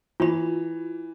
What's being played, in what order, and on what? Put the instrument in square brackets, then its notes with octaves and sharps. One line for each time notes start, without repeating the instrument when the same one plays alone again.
[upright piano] E3 [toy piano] F4 B5